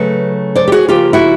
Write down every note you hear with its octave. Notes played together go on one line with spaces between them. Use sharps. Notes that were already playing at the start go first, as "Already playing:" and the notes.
Already playing: C#3 F#3 A3 B4
C5 D5
G4
F#4 G#4
C#3 F3 A#3 F4 G4
E4 F#4